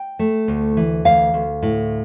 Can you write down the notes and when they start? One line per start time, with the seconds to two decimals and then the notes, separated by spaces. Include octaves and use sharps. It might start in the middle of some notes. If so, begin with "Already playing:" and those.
Already playing: G5
0.19 A3
0.48 D2
0.77 E3
1.05 D2 F5
1.34 D2
1.63 A2